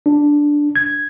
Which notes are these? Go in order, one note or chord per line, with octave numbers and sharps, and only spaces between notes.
D4
G#6